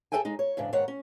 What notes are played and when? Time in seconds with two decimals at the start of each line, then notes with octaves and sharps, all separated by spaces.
0.12 G#4 A4 B4 E5 G5 G#5
0.25 G#3 D#4
0.39 C#5
0.57 E2 G#2 C#3 D4
0.73 D#2 G#2 D#3 C#5 F#5
0.88 C#4